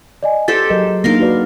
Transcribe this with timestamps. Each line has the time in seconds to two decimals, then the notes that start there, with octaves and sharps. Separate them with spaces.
0.23 D5 D#5 G#5
0.48 G4 A4 C5 A6
0.70 F#3 G#4 A#4 D#5
1.04 A#3 D4 D#4 A#4 F5 C6 A#6
1.20 F#4 B4 D5